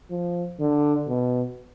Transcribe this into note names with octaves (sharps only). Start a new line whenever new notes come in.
F3
D3
B2